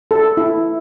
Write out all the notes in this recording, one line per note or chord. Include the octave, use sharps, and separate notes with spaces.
A4
E4